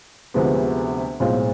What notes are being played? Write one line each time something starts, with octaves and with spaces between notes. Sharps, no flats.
D2 C3 F3 G#3 B3
B1 A2 G#3 C4 F4